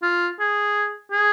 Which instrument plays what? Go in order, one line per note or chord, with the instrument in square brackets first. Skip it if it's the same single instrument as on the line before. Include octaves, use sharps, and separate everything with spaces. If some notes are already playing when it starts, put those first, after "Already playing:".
[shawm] F4
G#4
G#4